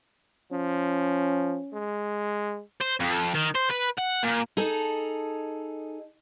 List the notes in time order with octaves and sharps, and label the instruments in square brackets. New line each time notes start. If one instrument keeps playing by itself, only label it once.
[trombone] F3 [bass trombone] C#4
[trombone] G#3
[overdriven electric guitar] C5
F2
D#3
C5
B4
F#5
A#2
[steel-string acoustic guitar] D#4 G#4 A4